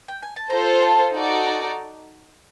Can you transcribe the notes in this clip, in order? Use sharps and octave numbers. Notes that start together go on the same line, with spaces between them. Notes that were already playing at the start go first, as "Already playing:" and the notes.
G5
G#5
A5
F4 A4 C5 A#5
A5
D#4 F#4 A4 D5
A#5